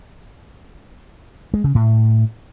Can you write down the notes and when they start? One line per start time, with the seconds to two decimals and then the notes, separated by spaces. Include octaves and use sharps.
1.54 G#3
1.64 C#3
1.75 A2